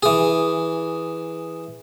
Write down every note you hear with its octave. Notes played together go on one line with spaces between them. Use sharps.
E3 G#4